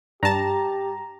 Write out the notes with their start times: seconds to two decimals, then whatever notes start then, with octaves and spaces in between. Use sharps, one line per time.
0.23 G2 G4 A5 A#5